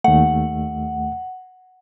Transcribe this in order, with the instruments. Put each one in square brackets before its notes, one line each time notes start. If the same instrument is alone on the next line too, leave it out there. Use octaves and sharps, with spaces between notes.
[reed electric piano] D#2 A3 [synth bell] F#5